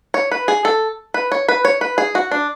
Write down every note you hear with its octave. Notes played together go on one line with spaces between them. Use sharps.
C#5
B4
G#4
A4
B4
C#5
B4
C#5
B4
G#4
F#4
D4